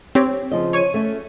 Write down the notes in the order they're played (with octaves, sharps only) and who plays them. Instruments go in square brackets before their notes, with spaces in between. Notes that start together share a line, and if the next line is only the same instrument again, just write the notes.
[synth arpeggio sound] C4 G4 C#5
[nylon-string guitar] C#3 F3 D#5
[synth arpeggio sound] C#5 C#6 D#7
[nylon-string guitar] A3 C#4